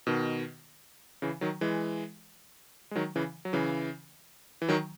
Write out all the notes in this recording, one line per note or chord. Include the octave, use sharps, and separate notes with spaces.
B2 D#3
C#3 E3
D#3 F#3
E3 G#3
G#3
D#3 F#3
C#3 E3
F#3
C#3 E3
E3
D#3 F#3